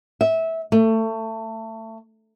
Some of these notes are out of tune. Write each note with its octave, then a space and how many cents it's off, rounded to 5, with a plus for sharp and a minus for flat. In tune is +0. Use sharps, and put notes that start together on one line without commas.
E5 -20
A3 +25